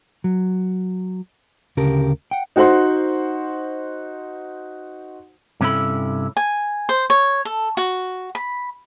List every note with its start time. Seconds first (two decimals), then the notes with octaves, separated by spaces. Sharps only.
0.24 F#3
1.77 D2 C#3 G4 A#4 A5
2.31 F#5 G5
2.56 D#4 F#4 C5 F#5 C6
5.61 G2 C3 C#4 E4 A4 B5
6.37 G#5
6.89 C5
7.10 C#5
7.45 A4
7.77 F#4
8.35 B5